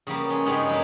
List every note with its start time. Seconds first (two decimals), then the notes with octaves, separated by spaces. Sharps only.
0.07 C#3 G3 A#3 B3
0.30 G#3 C#4
0.45 G2 C#3 G3 G#3 B3 D#4
0.69 F#3 A#3 B3